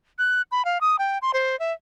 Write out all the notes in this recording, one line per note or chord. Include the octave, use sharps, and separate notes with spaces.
F#6
B5
F5
D#6
G5
C6
C5
E5